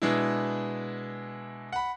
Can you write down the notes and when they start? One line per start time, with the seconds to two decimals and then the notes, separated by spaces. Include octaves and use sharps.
0.02 B2 G#3 D4 E4
1.72 F#5 B5